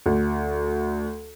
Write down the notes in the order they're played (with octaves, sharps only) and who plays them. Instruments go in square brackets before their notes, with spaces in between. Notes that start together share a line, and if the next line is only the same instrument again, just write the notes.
[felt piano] D2